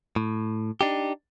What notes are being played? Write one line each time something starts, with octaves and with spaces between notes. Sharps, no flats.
A2
D4 D#4 G4